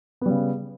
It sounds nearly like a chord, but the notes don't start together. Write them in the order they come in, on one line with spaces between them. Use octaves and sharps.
B3 G3 C#3